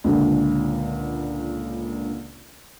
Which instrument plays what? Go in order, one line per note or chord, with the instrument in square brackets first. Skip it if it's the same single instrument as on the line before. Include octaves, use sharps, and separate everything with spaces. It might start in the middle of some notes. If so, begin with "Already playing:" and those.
[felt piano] C#2 A#2 D3